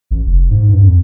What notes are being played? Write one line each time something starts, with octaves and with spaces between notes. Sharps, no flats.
A1
F1
G#2
G2
F2